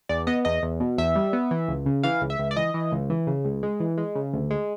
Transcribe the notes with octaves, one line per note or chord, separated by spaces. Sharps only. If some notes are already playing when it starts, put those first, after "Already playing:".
E2 D5
B3 D#5
E2 D#5
E2
B2
E2 E5
G3
B3
E3
C#2
C#3
E3 F5
C#2
E5
C#2
D5
E3 D#5
E3
C#2
E3
C#3
C#2
G#3
E3
G#3
C#3
D2
G#3